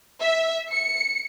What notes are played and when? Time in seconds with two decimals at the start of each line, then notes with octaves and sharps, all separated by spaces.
0.21 E5
0.72 C#7